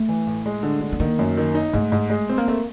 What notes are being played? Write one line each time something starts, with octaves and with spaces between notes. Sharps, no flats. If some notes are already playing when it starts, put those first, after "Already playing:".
Already playing: A3
E3
A2
G#3
D3
D3
B3
D#3 A#3
F#2
D#3
D#4
G#2 A3
G#2
G#3
C4
A#3
A3 A#3